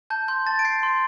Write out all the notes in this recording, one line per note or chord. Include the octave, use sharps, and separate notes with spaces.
A5 G6
C6 G6
A5 A6
D7
G6 C7
C6